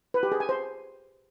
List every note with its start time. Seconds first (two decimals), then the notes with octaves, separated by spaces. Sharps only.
0.14 B4
0.23 G4
0.32 G#4
0.40 G#5
0.49 C5